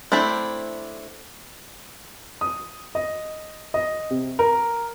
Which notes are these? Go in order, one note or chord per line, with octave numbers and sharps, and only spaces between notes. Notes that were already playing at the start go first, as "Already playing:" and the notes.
A3 C4 D4 E4 C5
D#6
D#5
D#5
C3
A#4